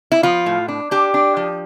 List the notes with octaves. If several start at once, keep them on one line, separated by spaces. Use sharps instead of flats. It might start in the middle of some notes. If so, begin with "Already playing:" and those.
E4
F3 F4
A2
D4
D4 G4
D4
F3